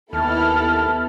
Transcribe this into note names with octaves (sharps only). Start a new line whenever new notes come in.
D#2 B3 E4 A4 A5 F6